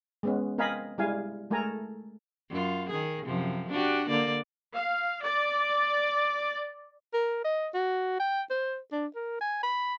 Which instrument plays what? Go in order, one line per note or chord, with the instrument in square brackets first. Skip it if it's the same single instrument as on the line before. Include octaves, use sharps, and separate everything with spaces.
[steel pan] G#3 B3 C#4
C4 A#4 D#5 F5 G#5 B5
G3 G#3 E4 F5 G#5
G#3 A3 A4 A#4 G#5 A#5
[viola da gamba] F#2 F4
D#3 G#4
F#2 C3 F3
D4 F#4 G4
D3 A#3 D5
[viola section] F5
D5
[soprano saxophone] A#4
D#5
F#4
G5
C5
D4
A#4
G#5
B5